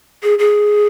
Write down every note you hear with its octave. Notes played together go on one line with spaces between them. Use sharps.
G#4
G#4